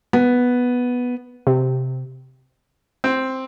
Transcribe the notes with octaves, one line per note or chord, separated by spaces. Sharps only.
B3
C3
C4